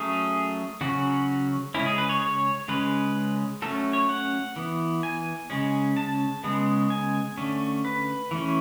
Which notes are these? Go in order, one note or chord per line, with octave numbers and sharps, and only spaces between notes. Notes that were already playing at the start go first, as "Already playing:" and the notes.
Already playing: F#3 A3 C#4 G#4
C#3 F#3 C#4 F#4
C#3 G#3 C#4 E4
G#4
B4
C#5
C#5
C#3 G#3 C#4 B4
F#3 A3 C#4 A4
C#5
F#5
E3 B3
G#5
C#3 G#3 C#4
A5
C#3 G#3 B3
G#5
D3 A3 C#4
B4
E3 A3 C#4